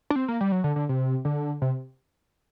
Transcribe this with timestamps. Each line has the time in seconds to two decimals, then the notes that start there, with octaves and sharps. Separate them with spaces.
0.11 D4
0.16 C4
0.28 A#3
0.41 G3
0.52 F#3
0.64 D3
0.76 D3
0.89 C3
1.25 D3
1.62 C3